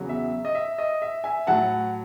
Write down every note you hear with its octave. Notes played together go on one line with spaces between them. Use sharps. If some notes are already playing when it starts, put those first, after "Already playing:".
Already playing: E2 C#3 F#3
E5
D#5
E5
D#5
E5
E5 G#5
A2 F#3 F#5 A5